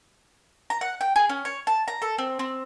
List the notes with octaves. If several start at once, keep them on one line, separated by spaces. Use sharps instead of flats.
A#5
F#5
G5
G#4
C#4
C#5
A5
A#5
A4
C4
C4